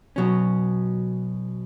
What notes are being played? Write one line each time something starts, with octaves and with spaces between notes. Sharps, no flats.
B2 F#3 C#4